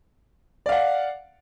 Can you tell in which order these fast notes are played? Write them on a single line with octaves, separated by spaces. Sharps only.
D5 F5 F#5